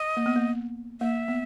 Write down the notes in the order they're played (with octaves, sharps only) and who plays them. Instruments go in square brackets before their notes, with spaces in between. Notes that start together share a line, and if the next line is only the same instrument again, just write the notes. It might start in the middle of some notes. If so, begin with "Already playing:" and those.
Already playing: [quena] D#5
[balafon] A#3
B3
A#3
[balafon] A#3 [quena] E5
[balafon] B3